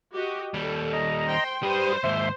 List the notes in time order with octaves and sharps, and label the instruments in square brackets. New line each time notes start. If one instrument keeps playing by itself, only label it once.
[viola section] F#4 G4 D#5
[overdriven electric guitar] D#2 G3 [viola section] A4
[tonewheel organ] D#5 A#5
[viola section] C5 G5 C6
[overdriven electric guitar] G3 B4 [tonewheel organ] G4 D#6 [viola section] C5
[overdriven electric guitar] D#2 G#2 [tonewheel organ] E5 C6